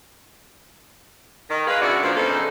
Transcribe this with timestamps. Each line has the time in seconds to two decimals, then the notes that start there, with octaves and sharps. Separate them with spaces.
1.50 D#3
1.67 G#3 B4 F5
1.82 C#3 B3 D4 E4 F#4 D5
2.02 A#2 F3 D4
2.16 C#3 F#3 B3 D#4 A4 C5